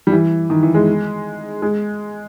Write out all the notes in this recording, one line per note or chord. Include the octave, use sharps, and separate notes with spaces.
G3
E3
D#3
E3
G#3
G#3